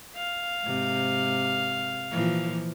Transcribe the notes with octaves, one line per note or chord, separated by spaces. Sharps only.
F5
G#2 C3
A#2 E3 F3